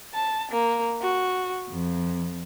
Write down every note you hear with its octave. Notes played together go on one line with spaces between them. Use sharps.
A5
A#3
F#4
F2